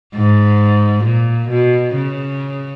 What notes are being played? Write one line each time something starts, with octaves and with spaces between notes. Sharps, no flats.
G#2
A#2
B2
C#3